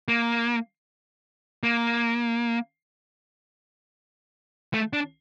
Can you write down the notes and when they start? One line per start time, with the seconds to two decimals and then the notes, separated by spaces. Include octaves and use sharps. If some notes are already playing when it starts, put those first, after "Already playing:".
0.08 A#3
1.63 A#3
4.74 A3
4.93 D4